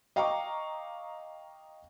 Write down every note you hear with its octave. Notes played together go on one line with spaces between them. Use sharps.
D#5 F5 G5 A#5 C#6 D6